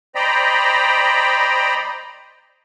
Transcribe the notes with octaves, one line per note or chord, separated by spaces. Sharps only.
C5 D5 D#5 G5 A#5 B5